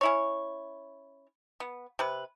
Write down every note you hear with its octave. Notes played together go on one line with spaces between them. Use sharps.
C#4 E4 C#5
B3
C3 B4